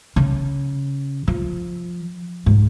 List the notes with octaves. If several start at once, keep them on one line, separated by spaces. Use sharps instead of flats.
C#3
F3
G#2